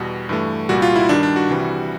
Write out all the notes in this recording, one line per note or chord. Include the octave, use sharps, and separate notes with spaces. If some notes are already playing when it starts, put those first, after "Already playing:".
Already playing: E2 B2 G3 F#4
G2 E3 A3
C2 A#2 G3 F#4
F4
E4
G2 D#3 G3 D4
D4
F#4
C2 C3 E3 G3